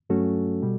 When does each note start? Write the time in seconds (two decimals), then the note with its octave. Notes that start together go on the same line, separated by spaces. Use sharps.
0.10 G2 F#3 A3 C#4 F#4 A4
0.62 B2 G3